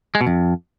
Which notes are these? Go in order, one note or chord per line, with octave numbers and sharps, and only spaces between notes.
G#3
B2
F2